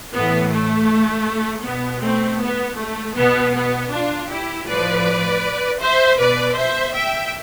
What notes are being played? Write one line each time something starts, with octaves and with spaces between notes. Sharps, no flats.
A2 E3 B3
A3
B2 B3
A3 C4
B3
A3
B2 B3
B3
D4 F4
E4 G4
A2 F3 B4 D5
C5 E5
B2 B4 D5
C5 E5
E5 G5